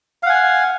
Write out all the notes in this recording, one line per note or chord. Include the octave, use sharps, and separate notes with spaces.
F5 F#5 G#5